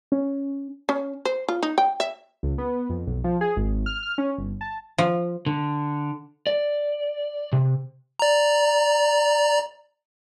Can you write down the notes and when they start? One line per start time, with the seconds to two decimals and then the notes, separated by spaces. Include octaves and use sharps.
0.12 C#4
0.89 C#4
1.25 C5
1.48 F4
1.63 D#4
1.78 G5
2.00 E5
2.43 C#2
2.58 B3
2.90 F2
3.07 B1
3.24 F3
3.41 G#4
3.57 G#1
3.86 F6
4.03 F6
4.18 C#4
4.38 G1
4.61 A5
4.98 F3
5.46 D3
6.47 D5
7.53 C3
8.20 D5 A#5